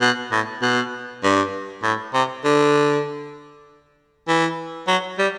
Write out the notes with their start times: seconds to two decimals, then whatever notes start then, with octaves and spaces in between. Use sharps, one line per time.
0.01 B2
0.32 A2
0.62 B2
1.23 G2
1.83 A2
2.14 C3
2.44 D3
4.28 E3
4.88 F#3
5.18 G3